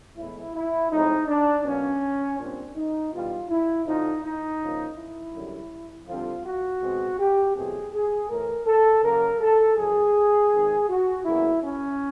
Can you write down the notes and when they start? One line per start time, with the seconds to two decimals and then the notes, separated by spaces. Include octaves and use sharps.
0.17 A2 E3 G#3 B3 E4
0.54 E4
0.91 A2 F3 G#3 C4 D#4
1.28 D4
1.65 B2 F#3 A#3 C#4
2.38 A#2 G3 C4 D4
2.75 D#4
3.13 E2 B2 G3 F4
3.50 E4
3.86 F2 D3 F3 D#4
4.23 D#4
4.60 C#3 F3 A#3
4.97 E4
5.34 F#2 D3 G3
6.07 F2 D3 G3 C4 F4
6.45 F#4
6.82 B2 G#3 C4
7.18 G4
7.55 E2 B2 F#3 A3 C4 G#4
7.93 G#4
8.29 A2 E3 A3 A#4
8.66 A4
9.03 C#3 F#3 A#3 A#4
9.40 A4
9.77 F#2 C#3 E3 G#4
10.52 G#2 D#3 G#3 C4
10.88 F#4
11.25 E2 C#3 F#3 A#3 E4
11.62 C#4